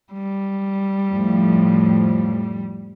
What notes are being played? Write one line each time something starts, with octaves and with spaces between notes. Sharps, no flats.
G3
F2 A2 F3